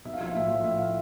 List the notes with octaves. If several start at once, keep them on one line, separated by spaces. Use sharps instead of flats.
B1 E5
F5
F3 E5
F5
A2 E5
F3
A2 E5
F5